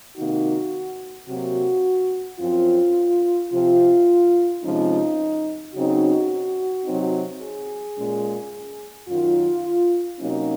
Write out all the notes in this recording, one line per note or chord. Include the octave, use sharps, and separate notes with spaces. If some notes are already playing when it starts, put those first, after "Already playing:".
C3 D#3 A#3 D#4 F#4
C3 F#3 A#3 F#4
F#2 F3 C4 F4
C3 F3 C4 F4
C3 F3 G#3 C#4 D#4
C#3 F#3 C4 D#4 F#4
C3 F#3 C4 D#4
G#4
A#2 G#3 C#4
F#2 D#3 F#3 F4
C3 F#3 A#3 C#4 D#4